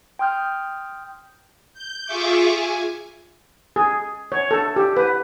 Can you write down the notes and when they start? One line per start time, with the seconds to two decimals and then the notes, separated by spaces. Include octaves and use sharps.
0.19 G5 C6 D#6 F6 G6
1.74 G6
2.05 F4 G#4 E5 C#6 D6
2.53 G#5
3.76 G#4
4.32 C#5
4.51 A4
4.76 G4
4.97 B4